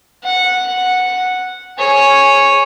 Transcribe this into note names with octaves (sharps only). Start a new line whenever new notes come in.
F#5
G#4 C#5